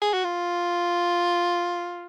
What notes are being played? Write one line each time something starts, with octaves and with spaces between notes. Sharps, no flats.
G#4
F#4
F4